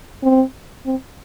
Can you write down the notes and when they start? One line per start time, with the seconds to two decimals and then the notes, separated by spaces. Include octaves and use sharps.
0.23 C4
0.86 C4